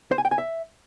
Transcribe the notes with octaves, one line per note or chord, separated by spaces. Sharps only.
C5
G#5
G5
G#5
E5